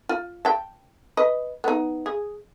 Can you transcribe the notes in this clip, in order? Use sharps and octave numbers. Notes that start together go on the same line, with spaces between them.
F4
G5 A5
B4 D#5
B3 D#4
G#4